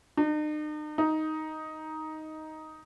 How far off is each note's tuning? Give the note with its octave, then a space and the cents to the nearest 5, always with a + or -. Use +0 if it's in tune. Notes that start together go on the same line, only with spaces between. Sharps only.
D#4 -45
D#4 +5